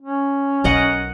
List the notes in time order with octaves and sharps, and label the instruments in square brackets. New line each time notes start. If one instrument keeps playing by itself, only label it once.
[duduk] C#4
[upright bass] B1 [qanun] A#4 D#5 F#5